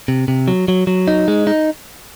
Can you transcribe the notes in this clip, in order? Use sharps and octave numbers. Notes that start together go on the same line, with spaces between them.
C3
C3
F#3
F#3
F#3
D#4
G#3
D#4